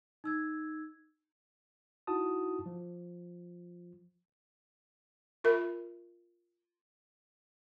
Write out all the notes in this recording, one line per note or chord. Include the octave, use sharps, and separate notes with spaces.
D#4 E6 G#6
D#4 E4 F#4 F#5 A5 D#6
F3
F4 A#4 E5 B5